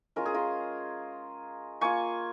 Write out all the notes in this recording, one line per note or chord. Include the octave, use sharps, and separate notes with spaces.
G#3 C#4 F4 A#4
G#4
F4 A#4
A#3 F4 G#5 C#6